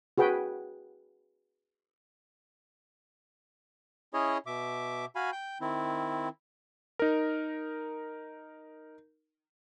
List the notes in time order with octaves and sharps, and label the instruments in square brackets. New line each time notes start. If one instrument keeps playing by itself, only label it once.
[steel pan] F#4 G#4 B4 G5
[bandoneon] C#4 E4 G#4 C#5 D#5
B2 E5 D6
F#4 F5 G#5 B5
G5 G6
D#3 C4 E4
[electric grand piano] D#4 A#4